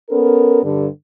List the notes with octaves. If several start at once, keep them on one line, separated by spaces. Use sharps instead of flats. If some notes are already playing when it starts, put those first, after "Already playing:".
B3 C#4 A4 A#4
G2 D3